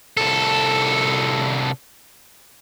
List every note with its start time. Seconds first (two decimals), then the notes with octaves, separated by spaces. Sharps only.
0.17 C2 A4